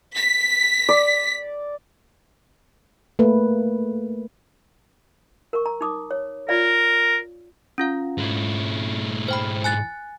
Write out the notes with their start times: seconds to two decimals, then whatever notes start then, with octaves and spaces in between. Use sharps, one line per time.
0.15 B6
0.89 D5
3.19 A3 A#3 B4
5.53 A#4 C#6
5.66 A#5
5.81 D#4 D6 D#6
6.11 C#5
6.49 F4 A#4 D5 F5
7.78 C#4 F4 F5
8.18 G#2 E4
9.28 C5 G5 B5
9.64 G#5 F#6 A6